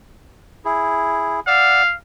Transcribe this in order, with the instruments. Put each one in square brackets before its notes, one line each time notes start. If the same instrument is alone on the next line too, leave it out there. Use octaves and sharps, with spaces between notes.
[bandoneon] E4 G#4
[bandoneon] D5 F#5 E6 [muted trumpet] F5